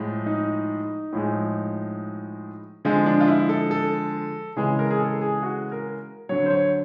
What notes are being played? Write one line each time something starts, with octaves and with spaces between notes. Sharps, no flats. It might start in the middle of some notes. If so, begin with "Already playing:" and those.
Already playing: A2 F3 G#3
D#4
A2 F3 G#3
D3 F3 G#3
D4
F4
E4
A4
A4
C#3 E3 G#3 G#4
A#4
G#4
A4
G#4
F#4
A#4
D3 F#3 C#5
C5
C#5